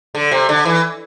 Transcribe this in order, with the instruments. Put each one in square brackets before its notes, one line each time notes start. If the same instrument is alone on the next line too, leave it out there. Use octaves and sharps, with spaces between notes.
[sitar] D3
C3
D3
E3